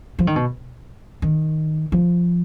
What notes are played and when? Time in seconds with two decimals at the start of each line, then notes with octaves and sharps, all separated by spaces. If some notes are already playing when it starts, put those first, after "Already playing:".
0.19 F3
0.27 D#3
0.36 B2
1.22 D#3
1.92 F3